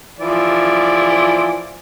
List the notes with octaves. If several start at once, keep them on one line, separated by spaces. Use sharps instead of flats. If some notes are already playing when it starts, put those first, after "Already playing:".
E3 F3 D5